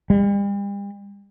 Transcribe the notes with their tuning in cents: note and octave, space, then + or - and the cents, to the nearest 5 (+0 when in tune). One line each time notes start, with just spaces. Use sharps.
G3 +40